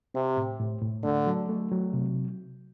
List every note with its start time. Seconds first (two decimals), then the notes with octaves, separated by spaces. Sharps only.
0.14 C3 C4
0.37 A2
0.60 A2
0.81 A2
1.04 D3 A3
1.27 F#3
1.49 A3
1.72 F#3
1.93 C3